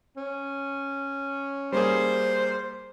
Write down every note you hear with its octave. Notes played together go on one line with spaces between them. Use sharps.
C#4
G3 A#3 G#4 C5